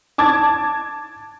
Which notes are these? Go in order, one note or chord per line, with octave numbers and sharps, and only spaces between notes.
A5 D6 G#6 A6